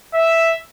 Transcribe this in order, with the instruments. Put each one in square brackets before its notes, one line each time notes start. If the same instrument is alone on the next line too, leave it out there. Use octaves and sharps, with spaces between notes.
[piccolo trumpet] E5